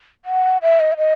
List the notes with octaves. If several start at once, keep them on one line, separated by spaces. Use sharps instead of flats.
F#5
E5
D#5
E5
D#5